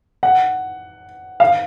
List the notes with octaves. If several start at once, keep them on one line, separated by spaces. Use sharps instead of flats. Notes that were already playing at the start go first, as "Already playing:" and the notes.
F#5
F5